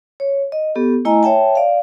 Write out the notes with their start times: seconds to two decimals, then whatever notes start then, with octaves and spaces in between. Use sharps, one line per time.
0.20 C#5
0.52 D#5
0.75 B3 G4 A4
1.05 A3 E4 D#5 G#5 A#5
1.23 C#5 E5 G5 A5
1.55 D5 F5